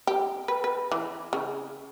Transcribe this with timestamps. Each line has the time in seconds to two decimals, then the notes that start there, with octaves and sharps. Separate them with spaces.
0.07 G4
0.48 B4
0.64 B4
0.92 E3
1.33 C#3